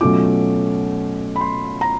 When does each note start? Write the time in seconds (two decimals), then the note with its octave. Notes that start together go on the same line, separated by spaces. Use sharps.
0.01 B2 F#3 A3 C#4 F4 D6
1.36 B5
1.41 C6
1.81 A#5